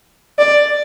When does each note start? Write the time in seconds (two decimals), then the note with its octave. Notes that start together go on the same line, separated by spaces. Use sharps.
0.39 D5